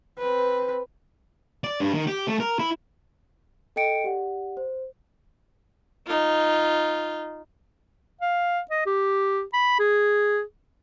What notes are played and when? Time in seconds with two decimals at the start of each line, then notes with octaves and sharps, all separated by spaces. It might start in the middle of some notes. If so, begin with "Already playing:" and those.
0.18 C4 B4
1.64 D5
1.80 G2
1.93 D#3
2.07 G4
2.28 A3
2.40 A#4
2.59 E4
3.76 A4 D#5 G5 C#7 D7
4.04 G4 D5 F#5
4.57 C5
6.07 D#4 F4
8.21 F5
8.71 D#5
8.86 G4
9.53 B5
9.79 G#4